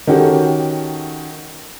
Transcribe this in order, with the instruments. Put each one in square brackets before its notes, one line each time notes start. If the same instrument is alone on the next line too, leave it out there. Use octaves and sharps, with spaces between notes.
[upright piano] D#3 C#4 F#4 G4 A4